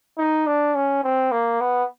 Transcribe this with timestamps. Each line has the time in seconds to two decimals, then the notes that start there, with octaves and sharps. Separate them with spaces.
0.18 D#4
0.46 D4
0.75 C#4
1.03 C4
1.32 A#3
1.61 B3